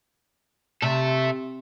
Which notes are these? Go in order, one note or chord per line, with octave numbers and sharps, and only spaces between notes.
C3 A4 E5